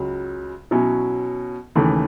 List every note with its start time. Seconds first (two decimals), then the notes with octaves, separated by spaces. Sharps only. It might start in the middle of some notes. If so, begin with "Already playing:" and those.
Already playing: C#2 C#3 F#3
0.71 B2 F#3 C#4 E4
1.75 D#2 C#3 E3 A3